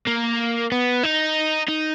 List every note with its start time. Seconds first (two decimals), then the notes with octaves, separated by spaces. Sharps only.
0.07 A#3
0.72 B3
1.03 D#4
1.68 D#4